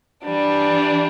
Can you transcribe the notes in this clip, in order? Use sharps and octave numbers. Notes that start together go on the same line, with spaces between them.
E3 G3 D4